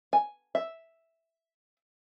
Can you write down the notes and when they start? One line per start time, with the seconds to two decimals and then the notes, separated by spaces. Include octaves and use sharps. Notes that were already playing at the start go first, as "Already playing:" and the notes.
0.13 G#5
0.55 E5